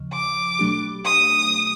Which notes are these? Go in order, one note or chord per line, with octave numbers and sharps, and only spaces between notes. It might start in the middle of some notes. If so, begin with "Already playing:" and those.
Already playing: D#2 C#3 F3
D6
B2 F#3 A3 D4 G4
D#6